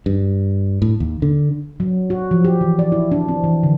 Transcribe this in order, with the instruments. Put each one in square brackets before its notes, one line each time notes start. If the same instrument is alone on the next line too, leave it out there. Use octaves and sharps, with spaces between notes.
[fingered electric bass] G2
A2
D#2
D3
[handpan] F#3
F#4
F3
G4
E3
D5
E4
D4
C4
E3
D3